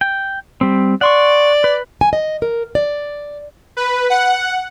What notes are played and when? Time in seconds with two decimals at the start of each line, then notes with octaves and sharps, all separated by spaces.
0.01 G5
0.61 G3 C4
1.01 D5 F#5 C6 C#6
1.64 B4
2.01 G#5
2.13 D#5
2.42 A#4
2.75 D5
3.77 B4
4.10 F#5